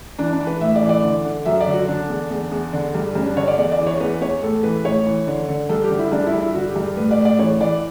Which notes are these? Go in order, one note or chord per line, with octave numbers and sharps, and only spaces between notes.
E3 D4
D4
E3
B4
A2 E5
D5
E3
D5
D3
D3
F#2 E5
D5
D3
F#4
D3 D4
E2
E2
E2
D3
G2
G2 C#4
D4
D3 C#5
D5
E2 D5
D5
E3
C#5
E2 B4
E2 C#5
A2 A4
E3 B4
A2 C#5
E3
D3
D3
G2 A4
G4
D3
E4
G2 D4
E4
G2
E4
D3 F#4
G4
G2
A2 B4
D5
A2
D5
E3 C#5
E3 D5